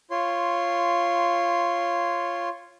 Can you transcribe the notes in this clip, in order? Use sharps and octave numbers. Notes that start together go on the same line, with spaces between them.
F4 C#5 C6